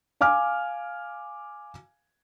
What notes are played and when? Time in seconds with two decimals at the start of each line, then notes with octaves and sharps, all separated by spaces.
0.21 F5 G#5 D6 F6